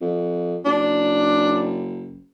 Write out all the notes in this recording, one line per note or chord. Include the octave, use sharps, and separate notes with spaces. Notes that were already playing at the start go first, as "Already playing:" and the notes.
F2
F#1 D4